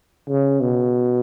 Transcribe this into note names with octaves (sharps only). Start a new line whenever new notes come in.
C#3
B2